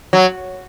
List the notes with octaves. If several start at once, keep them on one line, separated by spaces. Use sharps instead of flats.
F#3